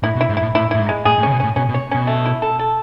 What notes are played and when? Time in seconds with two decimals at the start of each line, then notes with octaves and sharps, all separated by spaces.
0.03 A2 E4
0.16 B2
0.21 E4
0.29 G#2
0.37 A2 E4
0.55 A2 E4
0.71 A2 E4
0.79 G#2
0.89 G#3
1.05 A2 G#4
1.18 A2
1.23 C#3 C#4
1.32 B2
1.40 A2 C#4
1.56 B2 C#4
1.69 B2
1.74 C#5
1.91 B2 C#4
2.07 A3
2.25 E4
2.42 A4
2.59 A4